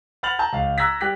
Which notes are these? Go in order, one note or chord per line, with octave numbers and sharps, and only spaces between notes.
F#5 B5 F6 A6 F7 F#7
A5 A#5 G6
C#2 F5
A#5 E6 F#6 G#6 A#6 B6
G3 G4 F#6 B6